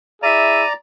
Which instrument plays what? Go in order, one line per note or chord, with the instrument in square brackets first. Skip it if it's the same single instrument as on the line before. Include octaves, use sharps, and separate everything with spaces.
[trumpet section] E4 G#4 E5 [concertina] D5 A#5 [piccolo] D#7